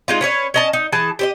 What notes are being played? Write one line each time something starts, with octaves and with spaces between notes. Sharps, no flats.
G#3 D#4 F4
C#4 B4 C#5
C#4 D#5 A5
D#4
E3 G#4 A5
G4 C5 D#5